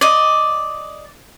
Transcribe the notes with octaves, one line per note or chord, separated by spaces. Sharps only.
D5 D#5